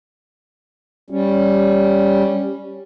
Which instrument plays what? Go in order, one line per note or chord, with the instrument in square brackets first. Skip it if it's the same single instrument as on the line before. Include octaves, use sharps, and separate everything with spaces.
[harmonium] G3 C#4